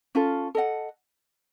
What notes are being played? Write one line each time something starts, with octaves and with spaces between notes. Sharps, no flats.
C#4 F4 A4
A4 D#5 F#5